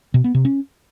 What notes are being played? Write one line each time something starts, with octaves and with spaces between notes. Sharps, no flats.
B2
B3
C3
C#4